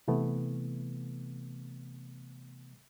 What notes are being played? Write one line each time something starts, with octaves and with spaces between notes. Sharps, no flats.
C3 E3 A3 B3